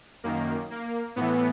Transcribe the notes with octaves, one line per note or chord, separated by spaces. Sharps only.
F#2 D#3 A#3
A#3
A2 E3 B3